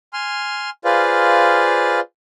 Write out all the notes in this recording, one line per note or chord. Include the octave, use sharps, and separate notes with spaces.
G#5 C6 F6
F4 G#4 B4 C5 D5 F5